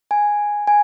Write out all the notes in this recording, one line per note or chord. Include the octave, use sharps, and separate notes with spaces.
G#5
G#5